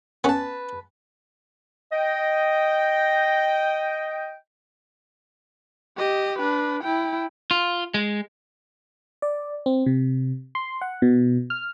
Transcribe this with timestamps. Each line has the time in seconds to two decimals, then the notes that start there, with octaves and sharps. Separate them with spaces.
0.24 B3 C#4 B4 A5
1.92 D#5 G5
5.97 G4 D#5
6.39 D4 B4
6.84 E4 G5
7.51 F4
7.94 G#3
9.22 D5
9.66 C4
9.86 C3
10.55 C6
10.81 F#5
11.02 B2
11.50 F6